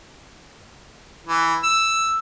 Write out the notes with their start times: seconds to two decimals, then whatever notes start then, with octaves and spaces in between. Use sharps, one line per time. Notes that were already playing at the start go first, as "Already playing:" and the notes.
1.27 E3
1.64 E6